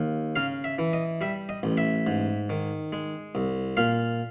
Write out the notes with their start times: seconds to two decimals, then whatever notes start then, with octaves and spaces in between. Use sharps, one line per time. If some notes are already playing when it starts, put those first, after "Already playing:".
Already playing: D#2
0.36 C#3 F5
0.64 E5
0.79 E3
0.93 D#5
1.21 G3 E5
1.49 D#5
1.63 A1
1.77 E5
2.07 G#2
2.50 D#3
2.93 G#3
3.35 C2
3.77 A#2 F5